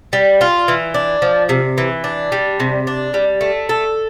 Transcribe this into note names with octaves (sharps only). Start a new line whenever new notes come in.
G3
F4
E3
D4
F3
C3
E3
D4
G3
C3
D4
G3
A3
A4